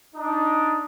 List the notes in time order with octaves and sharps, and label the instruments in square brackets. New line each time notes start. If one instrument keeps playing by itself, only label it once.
[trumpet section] D4 D#4